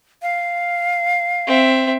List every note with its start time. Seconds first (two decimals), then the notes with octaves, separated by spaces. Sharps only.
0.22 F5
1.47 C4 E5